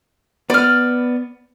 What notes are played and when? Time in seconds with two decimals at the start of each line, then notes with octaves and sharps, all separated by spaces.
0.50 B3 B4 D5 F6